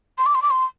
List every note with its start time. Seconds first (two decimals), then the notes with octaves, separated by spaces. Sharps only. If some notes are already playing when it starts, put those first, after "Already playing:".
0.18 C6
0.26 D6
0.35 C6
0.42 D6
0.51 C6